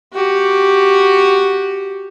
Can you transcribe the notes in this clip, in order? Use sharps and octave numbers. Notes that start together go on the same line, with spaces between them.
F#4 G4